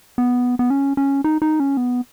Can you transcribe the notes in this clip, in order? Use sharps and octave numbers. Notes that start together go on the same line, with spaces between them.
B3
B3
C#4
C#4
D#4
D#4
C#4
B3